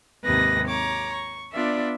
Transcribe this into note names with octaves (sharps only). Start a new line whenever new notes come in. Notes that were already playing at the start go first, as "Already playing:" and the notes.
D#2 G#2 C3 B4 D#6 A#6
C#5 A#5 D6
C#6
B3 D4 F4 D5 E5